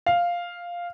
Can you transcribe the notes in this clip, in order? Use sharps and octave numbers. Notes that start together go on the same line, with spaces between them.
F5